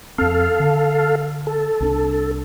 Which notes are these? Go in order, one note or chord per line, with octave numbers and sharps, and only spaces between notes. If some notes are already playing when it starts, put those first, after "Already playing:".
F2 C4 A4 F5
D3
A4
C2 C#4 D4